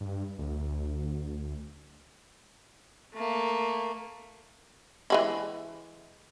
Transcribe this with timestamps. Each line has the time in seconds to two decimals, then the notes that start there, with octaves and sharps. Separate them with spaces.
0.01 G2
0.38 D2
3.14 A3 A#3
5.10 E3 G#3 E4